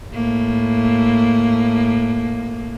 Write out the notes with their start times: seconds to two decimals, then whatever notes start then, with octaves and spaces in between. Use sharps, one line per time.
0.13 A2 A#3